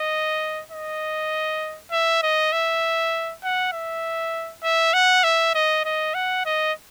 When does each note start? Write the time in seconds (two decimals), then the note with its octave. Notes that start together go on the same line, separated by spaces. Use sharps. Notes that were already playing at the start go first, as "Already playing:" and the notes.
Already playing: D#5
0.71 D#5
1.91 E5
2.23 D#5
2.52 E5
3.43 F#5
3.73 E5
4.63 E5
4.94 F#5
5.24 E5
5.55 D#5
5.85 D#5
6.14 F#5
6.45 D#5